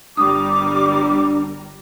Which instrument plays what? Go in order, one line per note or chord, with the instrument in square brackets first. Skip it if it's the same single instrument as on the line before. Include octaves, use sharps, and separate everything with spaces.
[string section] G1 G3 A#4 [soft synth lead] D4 [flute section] D6 [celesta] D#6